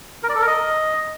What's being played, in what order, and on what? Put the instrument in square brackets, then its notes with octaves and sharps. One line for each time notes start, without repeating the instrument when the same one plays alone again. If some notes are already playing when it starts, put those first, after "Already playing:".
[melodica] A#4
D5
A4
A#4
D#5